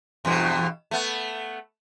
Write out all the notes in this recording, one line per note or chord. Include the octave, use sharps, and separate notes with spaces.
E2 G2 B2
A3 B3